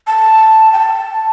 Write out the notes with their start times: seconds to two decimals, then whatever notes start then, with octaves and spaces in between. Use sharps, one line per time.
0.07 A5
0.73 G5
0.79 A5